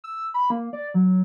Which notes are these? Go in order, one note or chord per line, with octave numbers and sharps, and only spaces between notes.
E6
B5
A#3
D5
F#3